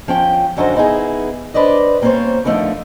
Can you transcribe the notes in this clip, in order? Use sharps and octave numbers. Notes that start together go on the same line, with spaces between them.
F3 C#4 G5
F#2 D3 D#4 F#4 C5 A#5
B3 D#4 E4 G#4
D4 B4 C5 D5 D#5
G3 A#3 C4 C#4 C5 C#5
D3 F3 A3 C4 D#4 A#4